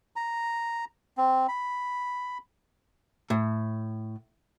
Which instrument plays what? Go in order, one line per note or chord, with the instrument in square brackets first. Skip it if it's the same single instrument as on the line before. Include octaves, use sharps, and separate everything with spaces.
[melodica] A#5
C4
B5
[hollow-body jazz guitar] A2